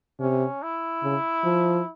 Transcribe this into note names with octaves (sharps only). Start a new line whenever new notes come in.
C3 C#4
E4
C#3
F3